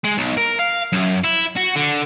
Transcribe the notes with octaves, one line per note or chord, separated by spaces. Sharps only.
G#3
B1
A#4
F5
F#2
E4
F#4
D3